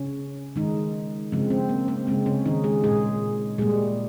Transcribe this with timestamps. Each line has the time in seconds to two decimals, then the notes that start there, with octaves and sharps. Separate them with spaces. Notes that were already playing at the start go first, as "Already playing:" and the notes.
Already playing: C#3 C#4
0.56 D#3 G#3 D#4
1.32 C#3 F3 G#3 C4
1.50 C4
1.69 A#3
1.88 C4
2.07 C#3 G#3 C4
2.26 C#3 C#4
2.46 D#3 D#4
2.64 G#3 G#4
2.84 A#2 G#3 G#4
3.58 A#2 G3 G#3 A#3 G#4